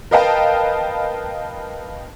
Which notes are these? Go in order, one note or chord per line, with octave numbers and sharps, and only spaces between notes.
A#4 B4 D#5 F5 G5 A5